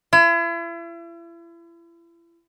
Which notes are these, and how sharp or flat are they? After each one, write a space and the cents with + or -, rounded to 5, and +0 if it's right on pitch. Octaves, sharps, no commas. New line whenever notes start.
E4 +40